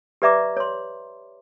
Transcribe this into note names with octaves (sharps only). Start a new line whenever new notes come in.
G4 B4 D5 E5 A#5 D6
C#5 C6